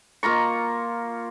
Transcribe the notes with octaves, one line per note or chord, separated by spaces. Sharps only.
A#3 F4 A#5 C#6